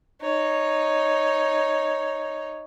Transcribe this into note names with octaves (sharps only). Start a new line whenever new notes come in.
D#4 C#5